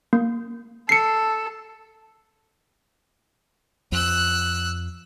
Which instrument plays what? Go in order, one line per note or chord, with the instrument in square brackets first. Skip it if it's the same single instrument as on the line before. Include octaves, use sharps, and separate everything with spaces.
[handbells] A#3
[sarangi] A4 [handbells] C7 C#7
[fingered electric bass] F2 [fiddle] E6 F#6